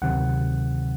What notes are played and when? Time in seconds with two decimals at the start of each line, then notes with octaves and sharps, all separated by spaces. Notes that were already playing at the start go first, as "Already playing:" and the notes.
0.02 D2 C3 D#3 F#3 C4 F#5